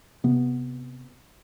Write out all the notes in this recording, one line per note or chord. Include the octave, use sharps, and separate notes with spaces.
C3 B3